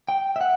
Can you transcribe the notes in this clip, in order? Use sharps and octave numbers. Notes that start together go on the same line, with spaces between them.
G5
E5
F#5